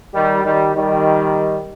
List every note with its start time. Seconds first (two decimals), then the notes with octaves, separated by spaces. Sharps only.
0.13 D#3 G3
0.44 D#3 G3
0.75 D#3 G3